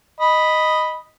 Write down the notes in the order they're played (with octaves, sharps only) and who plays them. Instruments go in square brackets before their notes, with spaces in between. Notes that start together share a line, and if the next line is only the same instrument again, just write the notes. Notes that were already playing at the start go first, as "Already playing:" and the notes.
[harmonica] D#5 B5